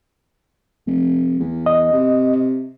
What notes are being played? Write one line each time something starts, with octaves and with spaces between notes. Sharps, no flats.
F1
E2
D#5
C3